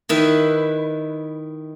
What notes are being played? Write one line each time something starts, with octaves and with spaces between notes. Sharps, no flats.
D#3 E4 B4